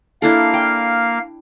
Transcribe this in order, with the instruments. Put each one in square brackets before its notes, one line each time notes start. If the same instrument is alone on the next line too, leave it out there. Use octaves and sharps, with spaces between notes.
[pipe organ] A#3 F5 [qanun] D4 E4 A4
[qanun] G5